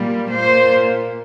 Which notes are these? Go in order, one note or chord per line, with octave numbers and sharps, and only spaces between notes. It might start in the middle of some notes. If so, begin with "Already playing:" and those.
Already playing: A#2 G3 A#3
A#2 A#3 C5